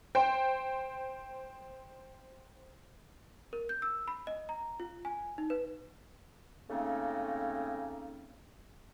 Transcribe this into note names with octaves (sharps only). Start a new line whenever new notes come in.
C5 G5
A#4
G6
E6
B5
D#5
A#5
F4
G#5
D#4
B4
C#3 A3 A#3 C4 C#4 D#4